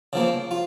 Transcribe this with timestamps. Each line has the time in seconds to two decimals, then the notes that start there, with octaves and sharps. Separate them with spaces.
0.13 C#3 F3 A#3
0.51 F4